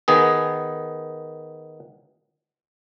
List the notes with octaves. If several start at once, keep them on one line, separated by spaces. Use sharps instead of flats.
D#3 B3 G#4